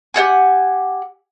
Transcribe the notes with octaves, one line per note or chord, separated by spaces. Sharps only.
G4 C#5 F#5 G#5